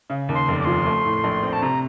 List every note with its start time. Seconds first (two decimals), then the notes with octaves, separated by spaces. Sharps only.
0.10 C#3
0.29 D#2
0.35 C6
0.48 F1
0.61 D6
0.65 F3 C6
0.86 A3
1.05 A2
1.24 A#1
1.43 C4
1.53 A5
1.62 C3 A#5